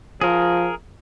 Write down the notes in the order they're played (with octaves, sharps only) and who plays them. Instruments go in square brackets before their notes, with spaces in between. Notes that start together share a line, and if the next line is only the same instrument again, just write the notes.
[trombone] F3 [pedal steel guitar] G#4 A#4